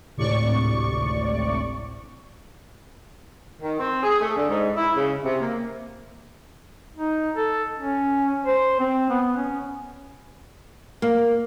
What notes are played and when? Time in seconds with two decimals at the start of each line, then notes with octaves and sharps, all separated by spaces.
0.17 G#1 D2 A2 C3 D5 C#6
3.61 D#3
3.79 C4
4.03 G#4
4.21 A3
4.36 D3
4.49 G#2
4.76 E4
4.96 C#3
5.24 C3
5.41 A#3
6.96 D#4
7.36 A4
7.77 C#4
8.46 C5
8.80 C4
9.10 B3
9.37 C#4
11.02 A#3